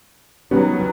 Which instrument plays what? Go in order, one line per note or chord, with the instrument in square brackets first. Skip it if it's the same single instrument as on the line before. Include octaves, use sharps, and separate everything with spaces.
[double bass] D#3 F#3 [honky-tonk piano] G3 B3 C#4